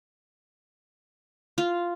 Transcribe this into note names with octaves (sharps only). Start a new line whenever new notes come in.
F4